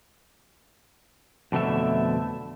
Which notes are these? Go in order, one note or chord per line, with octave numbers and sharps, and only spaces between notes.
F2 B2 D3 A3 E5